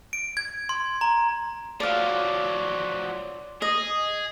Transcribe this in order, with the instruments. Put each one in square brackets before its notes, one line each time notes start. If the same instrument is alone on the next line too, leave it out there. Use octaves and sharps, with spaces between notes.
[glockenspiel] D7
G#6
C6
A#5
[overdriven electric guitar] F3 F#3 [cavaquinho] D5 F5
[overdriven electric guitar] G#4 [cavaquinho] D#5